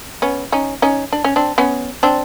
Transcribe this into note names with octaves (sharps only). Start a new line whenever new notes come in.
B3 C#4
C#4 D#4
C#4 D#4
D4
C#4
C4 D4
B3 C#4
C4 D4